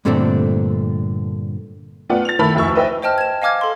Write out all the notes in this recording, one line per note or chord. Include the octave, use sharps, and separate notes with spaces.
G2 A#2 D3 A3 C4 D4
A3 B3 F4 D5 F#5
A6 F7
D#3 A3 E4 A4 B5
F1 D2 E4 E5 C#6 E6
B4 C5 D#5 E5 G5
C5 D#5 G5 A5 F6
G#6 E7
D#5 F5 G#5 D6 F6 G#6
A4 C6